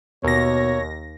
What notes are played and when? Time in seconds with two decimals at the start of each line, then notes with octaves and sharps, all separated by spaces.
0.24 D#2 B2 C#5 A#6